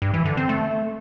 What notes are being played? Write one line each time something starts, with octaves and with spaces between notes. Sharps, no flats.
G2
E3
D3
C4
A3